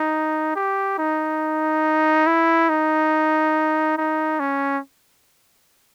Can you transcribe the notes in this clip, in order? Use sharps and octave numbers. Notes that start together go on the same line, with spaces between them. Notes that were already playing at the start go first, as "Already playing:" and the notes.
Already playing: D#4
G4
D#4
E4
D#4
D#4
C#4